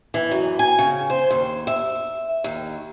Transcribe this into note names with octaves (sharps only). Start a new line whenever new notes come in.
E3
F#2
G#5
C#3
C5
D#2
E5
D#2